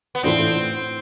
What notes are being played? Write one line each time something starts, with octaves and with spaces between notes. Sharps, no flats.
B3
A2 E3 A3 C4 D4 F4